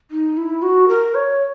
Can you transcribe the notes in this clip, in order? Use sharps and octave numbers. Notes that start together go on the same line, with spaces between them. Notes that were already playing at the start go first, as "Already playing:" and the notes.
D#4
E4
F#4
A#4
C#5